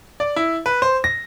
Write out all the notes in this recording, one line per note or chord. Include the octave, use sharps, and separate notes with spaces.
D5
E4
B4
C5
A#6